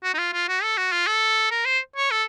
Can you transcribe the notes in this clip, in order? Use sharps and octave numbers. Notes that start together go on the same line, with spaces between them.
F#4
D#4
F4
F4
F#4
A4
F#4
F4
A4
A#4
C5
C#5
A4